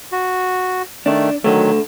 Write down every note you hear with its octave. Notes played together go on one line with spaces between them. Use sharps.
F#4
D#3 A3 D4
D3 D#3 F#3 A3